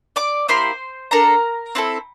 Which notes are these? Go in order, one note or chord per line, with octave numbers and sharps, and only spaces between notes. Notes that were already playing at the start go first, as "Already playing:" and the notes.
D5 D6
A#3 E4 G4 C5 C6
D4 A4 A#4 A#5
C4 E4 A4